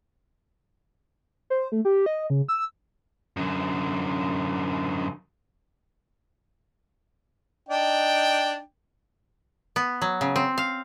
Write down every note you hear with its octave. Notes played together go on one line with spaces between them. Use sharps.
C5
A3
G4
D#5
C#3
E6
F#2 D3
D4 D#4 G5
B3
F#3
C#3
C4
F5